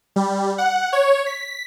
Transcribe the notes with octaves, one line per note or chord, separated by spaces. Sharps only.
G3
F#5
C#5
B6